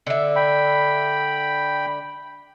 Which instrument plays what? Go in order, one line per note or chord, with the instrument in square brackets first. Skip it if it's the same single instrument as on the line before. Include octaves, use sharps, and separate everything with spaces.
[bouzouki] D3 E5
[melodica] G5 B5